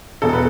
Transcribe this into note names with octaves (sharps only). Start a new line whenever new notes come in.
E1 E2 B2 A4
B4